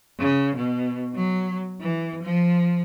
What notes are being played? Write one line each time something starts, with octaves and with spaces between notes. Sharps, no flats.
C#3
B2
F#3
E3
F3